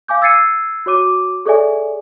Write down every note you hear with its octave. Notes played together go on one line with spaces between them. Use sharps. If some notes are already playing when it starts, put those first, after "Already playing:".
F5 G#5 D6 G6
E6 G#6 A6 C7 C#7 D#7
F#4 C#5 D6 D#7
G#4 A4 C#5 D5 E5 G#5